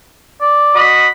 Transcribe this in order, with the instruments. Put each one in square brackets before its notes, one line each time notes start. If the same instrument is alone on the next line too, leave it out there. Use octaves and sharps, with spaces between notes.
[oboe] D5
[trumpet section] F#4 D#5 B5